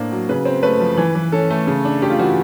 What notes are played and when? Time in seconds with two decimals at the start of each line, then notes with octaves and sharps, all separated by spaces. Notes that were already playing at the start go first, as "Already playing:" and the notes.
Already playing: A2 A#3 D4 C5
0.12 F#3
0.29 C#3 B4
0.45 C4
0.63 A3 B4
0.80 F3
0.97 E3
1.15 E3
1.32 C#4 A4
1.50 A3
1.67 C#3
1.85 D4
2.02 A3 G4
2.10 F4
2.19 E3 F#4